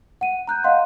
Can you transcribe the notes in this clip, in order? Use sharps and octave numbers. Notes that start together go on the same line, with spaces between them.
F#5 D#7
A#5 F#6 G6
D#5 F5 F#5 C6